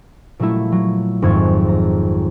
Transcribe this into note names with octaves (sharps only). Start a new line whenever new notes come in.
A#2 F#3 G3 A3 E4
F#3
G#1 F2 G#2 C#6 G#6 A6
A#5